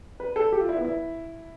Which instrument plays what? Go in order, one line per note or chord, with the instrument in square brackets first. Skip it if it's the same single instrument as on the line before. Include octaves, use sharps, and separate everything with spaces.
[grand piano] B4
A4
G4
F4
E4
B3
E4